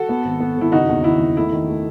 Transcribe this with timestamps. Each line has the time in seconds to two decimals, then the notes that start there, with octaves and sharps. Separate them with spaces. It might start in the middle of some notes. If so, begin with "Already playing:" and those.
Already playing: F#4 A4
0.09 B3
0.25 G#1
0.40 B3
0.57 G#1 E4
0.72 F#1 D#4 F#4
0.89 E2
1.04 D#3 E4
1.21 E2
1.37 A3 E4
1.52 D#3
1.68 A3